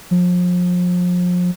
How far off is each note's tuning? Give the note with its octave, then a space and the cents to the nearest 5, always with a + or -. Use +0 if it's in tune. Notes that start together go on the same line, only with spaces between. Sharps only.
F3 +35